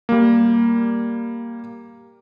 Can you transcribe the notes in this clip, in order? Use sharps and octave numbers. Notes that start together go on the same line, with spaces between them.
G3 A#3